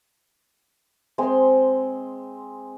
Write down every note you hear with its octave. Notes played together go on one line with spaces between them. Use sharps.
G#3 C4 C6